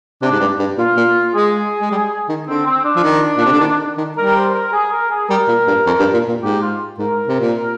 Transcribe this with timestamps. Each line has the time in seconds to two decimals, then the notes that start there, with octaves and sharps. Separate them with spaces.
0.22 C3 D4
0.32 G#2
0.40 G2
0.59 G2
0.78 A#2 F4
0.97 A#2
1.34 G#3 G#4
1.81 G#3
1.91 G3
2.29 D#3
2.48 D3 C4
2.66 C4
2.85 D4
2.96 F3
3.03 D#3
3.38 A#2
3.45 C3
3.52 D3
3.60 D#3
3.98 D#3
4.17 G3 A#4
4.36 C5
4.54 A#4
4.73 G#4
4.92 A#4
5.10 G#4
5.30 G3 A#4
5.48 A#2
5.68 G2
5.87 F2
6.00 G2
6.14 A#2
6.29 A#2
6.42 G#2 G4
6.62 F4
6.99 G#2 A#4
7.28 C3
7.40 A#2